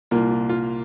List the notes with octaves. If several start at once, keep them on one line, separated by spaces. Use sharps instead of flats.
C2 A#2 A#3 F4
F4
F4